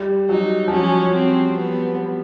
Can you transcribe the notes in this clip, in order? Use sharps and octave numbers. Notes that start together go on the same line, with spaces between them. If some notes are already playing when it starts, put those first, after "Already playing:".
Already playing: G3
F#3 D#4
F3
F#3 C#4
C4
B3